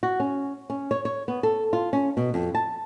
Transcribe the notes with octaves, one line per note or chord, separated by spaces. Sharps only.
F#4
C#4
C#4
C#5
C#5
B3
A4
F4
C#4
B2
F2
A5